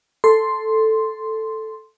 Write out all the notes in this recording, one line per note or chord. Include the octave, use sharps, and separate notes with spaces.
A4 C6